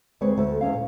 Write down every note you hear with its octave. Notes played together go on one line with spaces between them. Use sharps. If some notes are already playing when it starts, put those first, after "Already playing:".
D2 G#3 C4 B4 C#5
D2 A3 A4
E2 G#3 C#4 F5
A#2